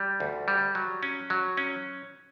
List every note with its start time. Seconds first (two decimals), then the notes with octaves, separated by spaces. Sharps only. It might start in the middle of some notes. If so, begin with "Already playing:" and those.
Already playing: G3
0.20 D2
0.48 G3
0.75 F#3
1.03 C#4
1.30 F#3
1.57 C#4